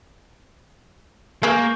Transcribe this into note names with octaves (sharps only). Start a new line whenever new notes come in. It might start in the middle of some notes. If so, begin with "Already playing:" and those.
G#3 A#3 G#4 B4 C#6 F6 G6